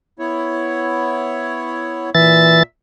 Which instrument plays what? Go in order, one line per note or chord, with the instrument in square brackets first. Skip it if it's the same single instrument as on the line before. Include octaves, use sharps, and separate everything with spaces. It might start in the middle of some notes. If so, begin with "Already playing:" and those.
[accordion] B3 E4 C#5
[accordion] A#2 E5 E6 [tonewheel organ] E3 A6